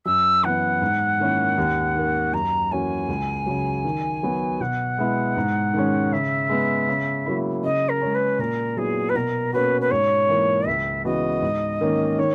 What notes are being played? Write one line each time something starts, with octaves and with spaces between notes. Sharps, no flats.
F#2 E6
E3 B3 F#5
G#2
D#3 A#3 C#4 E4
D#2
D#3 A#3
F#2 A#5
E3 A#3 C#4 F#4 G#5
C#2
C#3 F#3
D#3
F#3 B3 F#4
B2 F#5
G#3 B3 E4
G#2
D#3 G#3 C#4
C#3 E5
G#3 B3
C#3
F#3 A#3 E4
C#3 D#5
A#4
G#3 C#4
B4
A#2 A#4
F#3 B3 E4 G#4
B4
B2 A#4
A#3 C#4 F#4 B4
B4
G#2 C#5
E3 A#3
C#2 E5
C#3 E3 B3 F#4 D#5
G#2
D#3 A#3 C#4
D#3 C#5